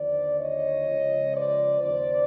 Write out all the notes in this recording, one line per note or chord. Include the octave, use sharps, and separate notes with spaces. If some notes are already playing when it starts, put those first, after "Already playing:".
Already playing: D#2 D3 F3 C5 D5
C#5 D#5
C#2 C#3 F3
C5 D5
D#2 C#3 F3 C5 D5